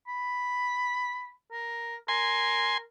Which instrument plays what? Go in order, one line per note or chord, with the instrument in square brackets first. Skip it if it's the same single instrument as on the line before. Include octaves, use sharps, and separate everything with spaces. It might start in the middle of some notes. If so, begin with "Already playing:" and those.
[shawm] B5
A#4
[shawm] A#4 [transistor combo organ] G#5 C6